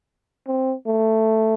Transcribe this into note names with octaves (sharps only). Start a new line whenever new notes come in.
C4
A3